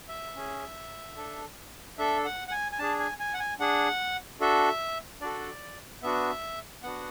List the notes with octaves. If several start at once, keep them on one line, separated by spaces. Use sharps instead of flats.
E5
C#4 G#4
D4 A4
D4 A4 E5
F#5
F#5
G#5
G#5
D4 G#4 A5
G#5
G#5
F#5
G#5
D4 G#4 F#5
D4 F#4 A4 E5
D4 F#4 A4 D5
B3 D4 F#4 E5
B3 D4 F#4 F#5